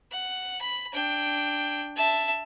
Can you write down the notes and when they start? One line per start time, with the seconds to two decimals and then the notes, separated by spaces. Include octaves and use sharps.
0.12 F#5
0.61 B5
0.93 D4 G5
1.96 E5 A5